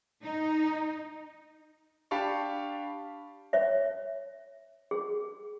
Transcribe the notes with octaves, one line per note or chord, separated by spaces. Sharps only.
D#4
D4 G4 F5 A5 B5 C#6
C#5 E5
G#4